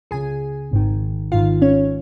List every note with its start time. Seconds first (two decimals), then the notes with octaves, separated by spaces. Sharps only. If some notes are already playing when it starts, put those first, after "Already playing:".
0.11 C#2 C#3 G#4 G#5
0.71 G#1 G#2 D#3
1.32 G#1 G#2 D#3 F4 F5
1.62 C#4 C#5